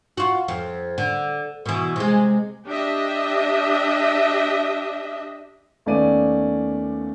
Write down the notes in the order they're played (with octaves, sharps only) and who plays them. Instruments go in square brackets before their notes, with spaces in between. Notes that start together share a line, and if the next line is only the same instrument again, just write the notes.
[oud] F4 F#4
F2
D3
B2 E3
C3 G#3
[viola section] D4 G4 D#5 E5
[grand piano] D#2 A3 B3 C#4 D5 D#7